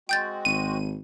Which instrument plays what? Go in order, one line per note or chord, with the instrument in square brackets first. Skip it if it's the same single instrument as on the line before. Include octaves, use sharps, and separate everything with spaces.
[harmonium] G#3 C4 F#4 [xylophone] G5 G6 A6
[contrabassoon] G#1 [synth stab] D#7